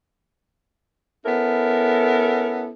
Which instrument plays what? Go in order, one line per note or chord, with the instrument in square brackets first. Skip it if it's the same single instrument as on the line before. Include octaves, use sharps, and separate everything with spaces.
[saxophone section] B3 C#4 E4 A4 A#4